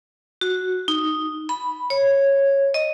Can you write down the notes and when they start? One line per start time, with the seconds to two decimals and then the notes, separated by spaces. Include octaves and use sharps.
0.41 F#4
0.88 D#4
1.49 B5
1.90 C#5
2.74 D#5